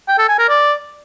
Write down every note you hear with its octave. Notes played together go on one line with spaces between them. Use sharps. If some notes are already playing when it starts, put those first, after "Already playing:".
G5
A4
G#5
A#4
D5